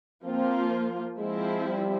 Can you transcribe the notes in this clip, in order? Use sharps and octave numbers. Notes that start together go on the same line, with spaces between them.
F3 A#3 C4 F4
F3 G#3 C4 E4
G3